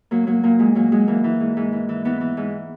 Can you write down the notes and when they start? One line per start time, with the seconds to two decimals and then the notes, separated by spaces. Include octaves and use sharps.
0.11 F#3 A#3
0.27 F#3 A#3
0.43 A#2 A#3
0.59 A#2 G#3
0.75 F#3 A#3
0.92 F#3 G#3
1.08 E3 A#3
1.24 E3
1.40 G#2
1.57 G#2
1.73 E3
1.89 E3
2.05 E3 B3
2.21 E3
2.37 G#2